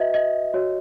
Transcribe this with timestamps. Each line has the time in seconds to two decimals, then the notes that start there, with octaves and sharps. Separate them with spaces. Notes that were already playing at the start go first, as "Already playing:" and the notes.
Already playing: F#4 B4 D#5 E5
0.14 D#5
0.54 F#4 C#5